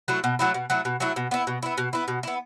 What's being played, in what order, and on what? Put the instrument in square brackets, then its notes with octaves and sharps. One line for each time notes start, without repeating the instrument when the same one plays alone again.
[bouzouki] F#3 A3 E4
B2
F#3 A3 E4
B2
F#3 A3 E4
B2
F#3 A3 E4
B2
B3 E4
B2
B3 E4
B2
B3 E4
B2
B3 E4